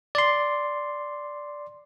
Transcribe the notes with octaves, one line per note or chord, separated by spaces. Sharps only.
D5 C6